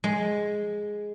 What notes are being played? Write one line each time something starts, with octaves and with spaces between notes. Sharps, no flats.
G#3